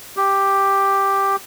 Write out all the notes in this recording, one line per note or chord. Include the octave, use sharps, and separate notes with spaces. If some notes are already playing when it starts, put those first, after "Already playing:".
G4